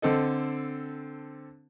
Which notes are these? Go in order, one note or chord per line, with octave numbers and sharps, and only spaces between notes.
D3 C4 A4 D#5